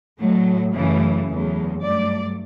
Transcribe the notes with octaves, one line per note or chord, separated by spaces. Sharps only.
A2 F#3 A3
F#2 C#3 E3 A3
E2 C#3 F#3 A3
G2 F#3 A3 D5